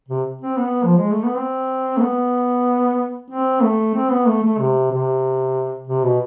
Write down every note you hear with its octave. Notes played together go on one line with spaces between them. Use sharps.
C3
C4
B3
F3
G#3
A3
B3
C4
A3
B3
C4
A3
C4
B3
A3
A3
C3
C3
C3
B2